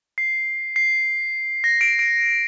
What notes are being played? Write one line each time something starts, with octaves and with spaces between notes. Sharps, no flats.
C7
C7
A#6
D7
D7